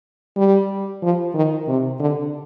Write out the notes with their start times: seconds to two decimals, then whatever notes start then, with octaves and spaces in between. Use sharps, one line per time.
0.37 G3
1.03 F3
1.34 D#3
1.68 C3
2.00 D3